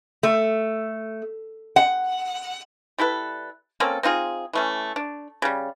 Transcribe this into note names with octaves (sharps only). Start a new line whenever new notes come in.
A3
F#5
G3 E4 A4 B4
A#3 C4 C#4 A4
C4 D#4 F4 G#4
E3 A3 C#4
D4
C#3 G3